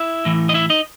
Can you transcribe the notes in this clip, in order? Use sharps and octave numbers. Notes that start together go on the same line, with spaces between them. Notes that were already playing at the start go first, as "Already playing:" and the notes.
Already playing: E4 E5
A2 E3
D#5
E4 E5
D#4 D#5